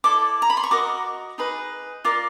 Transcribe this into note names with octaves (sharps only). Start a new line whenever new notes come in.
E4 A4 D5 D6
A#5
B5
C6
C#6
F#4 A#4 D#5 D6
D#4 G#4 B4
F4 A#4 D5 D6